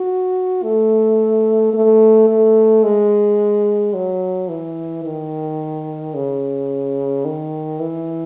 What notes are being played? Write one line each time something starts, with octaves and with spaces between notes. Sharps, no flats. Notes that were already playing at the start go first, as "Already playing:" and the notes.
Already playing: F#4
A3
A3
A3
G#3
F#3
E3
D#3
C#3
D#3
E3